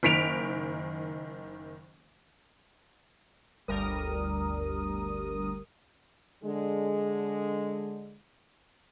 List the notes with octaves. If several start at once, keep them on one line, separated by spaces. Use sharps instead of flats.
F#1 D#3 B6 D7 F7
G1 D2 G3 A#4 D#6
D3 G#3